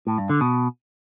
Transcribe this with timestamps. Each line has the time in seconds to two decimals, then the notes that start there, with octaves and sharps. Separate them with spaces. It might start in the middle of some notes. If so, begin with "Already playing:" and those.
0.07 A2
0.18 G2
0.30 D3
0.41 B2